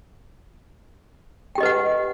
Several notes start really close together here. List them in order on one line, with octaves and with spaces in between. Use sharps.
G5 G4 D#5 B4 F#5